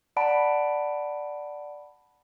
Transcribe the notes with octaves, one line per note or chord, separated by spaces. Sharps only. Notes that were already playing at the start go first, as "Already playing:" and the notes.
D5 F#5 A5 B5 D7